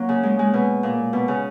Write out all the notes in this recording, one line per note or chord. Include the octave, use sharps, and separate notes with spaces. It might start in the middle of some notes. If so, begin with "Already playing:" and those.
Already playing: F#3 A#3
C#3
G#3
G#3
B2
A#2
B2
C#3